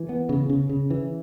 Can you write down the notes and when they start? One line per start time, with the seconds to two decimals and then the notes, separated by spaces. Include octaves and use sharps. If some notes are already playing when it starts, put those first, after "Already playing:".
Already playing: E3
0.09 B3
0.29 C#3
0.49 C#3
0.69 C#3
0.90 E3